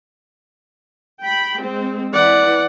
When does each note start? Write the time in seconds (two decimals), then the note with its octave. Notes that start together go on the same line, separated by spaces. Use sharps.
1.21 G5 B5
1.63 G#3 C4
2.13 E3 D5 F#5